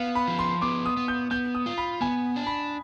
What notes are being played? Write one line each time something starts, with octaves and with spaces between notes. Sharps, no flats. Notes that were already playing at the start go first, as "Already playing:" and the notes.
Already playing: B3 F5
B5
F3
C6
B3 D6
D#6
B3
G6
B3 G6
D#6
F4
B5
B3 G#5
D4
B5